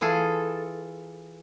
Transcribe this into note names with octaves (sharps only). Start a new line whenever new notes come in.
E3 F4 G#4 A4